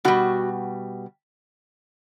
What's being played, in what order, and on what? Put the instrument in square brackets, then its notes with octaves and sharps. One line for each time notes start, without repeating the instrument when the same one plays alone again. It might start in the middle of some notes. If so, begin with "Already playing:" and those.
[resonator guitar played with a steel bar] B2 G3 F#4